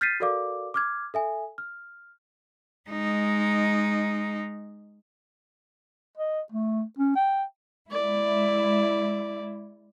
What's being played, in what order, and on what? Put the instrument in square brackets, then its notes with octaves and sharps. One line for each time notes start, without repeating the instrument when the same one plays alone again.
[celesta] F6 G6 A6 B6 C7 D#7
F#4 A4 A#4 D5 F5 D6
D6 F6 G#6
A4 E5 G#5
F6
[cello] G#3 D#4
[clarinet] D#5
A3
C#4
G5
[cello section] G#3 E4 [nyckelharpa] D5